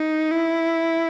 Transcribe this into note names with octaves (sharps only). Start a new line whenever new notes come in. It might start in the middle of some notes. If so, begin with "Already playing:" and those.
Already playing: D#4
E4